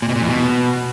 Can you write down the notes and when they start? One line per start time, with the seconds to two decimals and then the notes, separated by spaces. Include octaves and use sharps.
0.02 A#2
0.09 B2
0.16 A#2
0.22 E2
0.29 B2